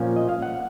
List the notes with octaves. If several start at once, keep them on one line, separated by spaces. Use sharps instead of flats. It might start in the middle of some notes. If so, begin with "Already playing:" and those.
Already playing: A#2 F3 A#3 C#4
D#5
F5
F#5